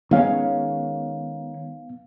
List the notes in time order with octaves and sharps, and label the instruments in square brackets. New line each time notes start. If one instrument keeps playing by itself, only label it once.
[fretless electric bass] D#3 G#3 C#4 [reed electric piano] B3 F5